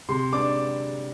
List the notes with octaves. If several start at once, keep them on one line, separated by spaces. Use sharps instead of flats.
C3 C6
D4 D6